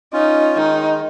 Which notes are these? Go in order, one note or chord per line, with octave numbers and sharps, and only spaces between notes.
C#4 D#4 F4
D#3 G#3 D#4